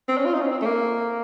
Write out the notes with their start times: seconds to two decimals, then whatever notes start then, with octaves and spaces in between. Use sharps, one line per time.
0.08 C4
0.17 C#4
0.25 F4
0.33 D#4
0.41 C#4
0.49 C4
0.62 A3
0.66 A#3